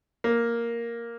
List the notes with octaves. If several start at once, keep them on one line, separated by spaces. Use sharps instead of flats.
A#3